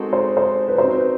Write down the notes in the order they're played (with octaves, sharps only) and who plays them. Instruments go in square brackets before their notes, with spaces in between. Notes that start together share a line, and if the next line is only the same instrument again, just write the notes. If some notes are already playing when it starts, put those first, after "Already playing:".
Already playing: [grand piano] G#3 C4 D#4 F#4 A4 [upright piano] A#4
[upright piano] C5
C5
B4
[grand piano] C4 D#4 F#4 [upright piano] C5
[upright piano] B4